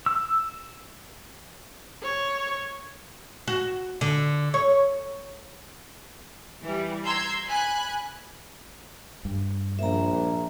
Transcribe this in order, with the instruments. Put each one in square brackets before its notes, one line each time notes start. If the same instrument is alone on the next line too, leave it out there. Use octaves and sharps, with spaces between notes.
[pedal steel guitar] E6
[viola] C#5
[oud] F#4
D3
C#5
[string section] E3 G3
A#5 C6 E6 G6 G#6
G#5 B5 F#6
[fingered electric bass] G2
[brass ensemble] A#1 [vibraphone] E5 A#5